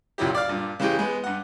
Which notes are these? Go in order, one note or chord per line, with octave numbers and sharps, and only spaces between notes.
C#2 A#2 F#3 E4 G4
D5 F5
G2 A#2
C#3 E3 G#3 G4 G5
G#3 B3
G2 F#5